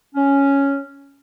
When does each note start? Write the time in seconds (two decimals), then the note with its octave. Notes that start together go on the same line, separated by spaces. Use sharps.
0.15 C#4